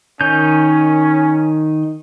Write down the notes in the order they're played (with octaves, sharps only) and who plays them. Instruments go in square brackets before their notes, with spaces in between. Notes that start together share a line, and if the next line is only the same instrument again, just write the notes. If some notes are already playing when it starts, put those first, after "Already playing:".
[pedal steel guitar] D#3 D#4 G6 [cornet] C#4